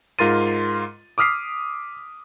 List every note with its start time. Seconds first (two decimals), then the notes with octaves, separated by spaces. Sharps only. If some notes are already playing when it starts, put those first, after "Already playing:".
0.19 G#2 F4 A#4 C6 A6 D#7
1.18 D6 D#6 F6 B6 C7